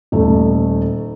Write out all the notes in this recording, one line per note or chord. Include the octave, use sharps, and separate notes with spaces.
D#1 A3